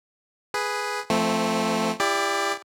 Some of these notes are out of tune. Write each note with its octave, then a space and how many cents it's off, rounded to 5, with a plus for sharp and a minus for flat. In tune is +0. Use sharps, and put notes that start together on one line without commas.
G#4 +0 B4 +0
F3 -25 A3 +0 C4 +0
E4 +25 G4 +30 D5 -5